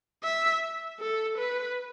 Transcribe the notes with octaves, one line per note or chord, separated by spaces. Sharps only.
E5
A4
B4